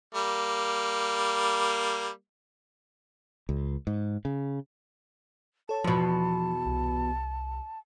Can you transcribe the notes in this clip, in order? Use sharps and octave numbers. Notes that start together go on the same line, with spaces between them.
G3 A#3
C#2
G#2
C#3
A4 C#5 A5
E2 B2 F3
C2